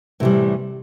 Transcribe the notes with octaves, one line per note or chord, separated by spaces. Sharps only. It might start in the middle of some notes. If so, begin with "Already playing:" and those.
A2 C3 E3 G3